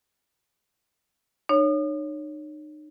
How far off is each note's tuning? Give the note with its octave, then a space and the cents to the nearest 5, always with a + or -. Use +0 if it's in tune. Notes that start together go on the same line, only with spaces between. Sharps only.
D#4 -40 C#5 +0